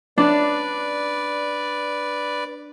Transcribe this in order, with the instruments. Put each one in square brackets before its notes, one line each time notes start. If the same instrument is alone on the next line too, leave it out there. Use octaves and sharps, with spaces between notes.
[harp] D4 [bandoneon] B4 D5